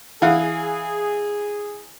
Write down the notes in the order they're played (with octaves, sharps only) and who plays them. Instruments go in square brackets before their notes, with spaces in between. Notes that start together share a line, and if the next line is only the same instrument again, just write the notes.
[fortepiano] E3 F5 F#5 [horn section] G#4